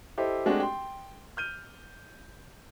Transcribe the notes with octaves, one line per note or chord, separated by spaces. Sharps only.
E4 G4 A4 C5 D#5
G#3 A3 C4 D4 F#4 G4
G5 C6
F6 G6 D#7